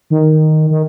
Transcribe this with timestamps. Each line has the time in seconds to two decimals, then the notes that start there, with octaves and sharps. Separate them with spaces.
0.10 D#3
0.70 D#3